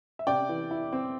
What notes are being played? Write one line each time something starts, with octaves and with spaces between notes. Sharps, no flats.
E5
C3 D5 G5
E3
E4
C4